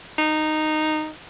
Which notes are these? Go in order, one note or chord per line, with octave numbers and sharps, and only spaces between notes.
D#4